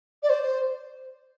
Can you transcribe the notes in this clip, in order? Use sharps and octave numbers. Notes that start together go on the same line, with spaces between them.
D5
C5